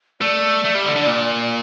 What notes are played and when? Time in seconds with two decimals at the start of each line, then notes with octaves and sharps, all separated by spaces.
0.21 A3 D5
0.64 A3
0.75 G3
0.85 D3
0.96 D3
1.07 A#2